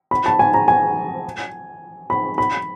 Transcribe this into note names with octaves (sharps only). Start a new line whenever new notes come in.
B5
A5
G#5
A#5
G#5
B5
B5